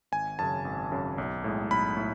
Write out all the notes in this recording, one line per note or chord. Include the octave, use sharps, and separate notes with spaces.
G#1 G#5
F#2 C#3 A5
G#1
F#2 C#3
B1
A2 G#3
B1 B5
A2